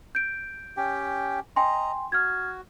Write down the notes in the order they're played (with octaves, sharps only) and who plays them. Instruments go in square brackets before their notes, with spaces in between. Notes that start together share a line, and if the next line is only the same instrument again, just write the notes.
[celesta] G6 D7
[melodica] C#4 G4 G5
[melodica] D#5 A#5 [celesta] G5 G#5 C6
[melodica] F#4 [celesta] F6 G#6